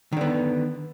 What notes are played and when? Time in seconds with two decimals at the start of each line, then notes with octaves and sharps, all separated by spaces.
0.12 D#3
0.17 D3
0.21 B3